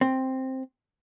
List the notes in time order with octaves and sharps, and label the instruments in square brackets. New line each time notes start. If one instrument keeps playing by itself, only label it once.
[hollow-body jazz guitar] C4